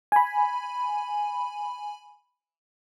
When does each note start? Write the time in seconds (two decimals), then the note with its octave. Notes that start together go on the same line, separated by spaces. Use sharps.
0.12 G#5 B5